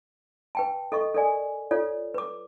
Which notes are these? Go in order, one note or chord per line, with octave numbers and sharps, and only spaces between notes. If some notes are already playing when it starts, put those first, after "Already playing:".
B4 G5 A5
A4 D#5 C#6
A4 A#4 D5 G#5
F4 A4 C#5 D5
B4 D6